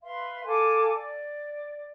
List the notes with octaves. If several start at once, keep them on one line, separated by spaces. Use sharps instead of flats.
B4 E5 F5 C6
A4 F5 G#5 D6
D5